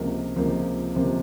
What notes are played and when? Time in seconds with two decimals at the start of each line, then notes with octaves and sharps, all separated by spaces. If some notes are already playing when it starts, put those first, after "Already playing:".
Already playing: C#2 C3 F3 A#3
0.36 C#2 C3 F3 A#3
0.95 C#2 C3 F3 A#3